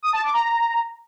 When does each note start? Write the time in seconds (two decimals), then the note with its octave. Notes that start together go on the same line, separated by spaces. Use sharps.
0.03 D#6
0.13 A5
0.23 D6
0.33 A#5